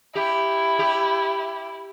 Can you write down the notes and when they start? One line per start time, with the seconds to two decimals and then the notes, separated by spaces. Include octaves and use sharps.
0.15 E4 G4
0.79 G4